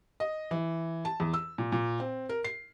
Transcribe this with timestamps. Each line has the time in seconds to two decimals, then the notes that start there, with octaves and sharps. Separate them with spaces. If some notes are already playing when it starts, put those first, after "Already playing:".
0.20 D#5
0.51 E3
1.05 A5
1.20 E2
1.34 E6
1.58 A#2
1.72 A#2
2.00 C4
2.29 A#4
2.44 C7